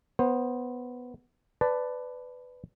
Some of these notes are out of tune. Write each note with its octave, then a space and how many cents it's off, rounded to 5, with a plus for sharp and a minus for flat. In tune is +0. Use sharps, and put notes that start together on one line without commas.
B3 +0 C5 +20
B4 +15 D5 +0 A5 +0